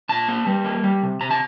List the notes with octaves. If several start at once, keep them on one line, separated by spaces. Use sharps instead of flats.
A#2 A5
A#3
G3
A#3
G3
C3
C3 A#5
A5